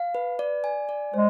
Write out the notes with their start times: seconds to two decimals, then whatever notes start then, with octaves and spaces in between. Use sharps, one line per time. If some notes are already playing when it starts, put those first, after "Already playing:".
Already playing: F5
0.15 B4
0.39 D5
0.64 G#5
0.89 D5
1.14 G#3 C5